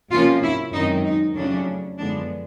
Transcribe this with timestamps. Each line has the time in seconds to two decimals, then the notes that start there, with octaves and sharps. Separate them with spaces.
0.11 C3 F3 A#3 C#4 F4
0.42 E4
0.73 F#2 D#3 G#3 C4 D#4
1.04 D#4
1.35 F2 C#3 F#3 A3 C#4 D4
1.98 F#2 D3 F3 G#3 B3 D4